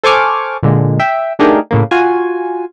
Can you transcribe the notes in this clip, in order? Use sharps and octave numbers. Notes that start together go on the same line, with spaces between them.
A4 C5 G#5 C#6 D6 F6
A#2 D3 G#3
E5 G5
A3 D4 D#4 G4 G#4 A#4
A2 C#3 A#3
F4 F#4 G#5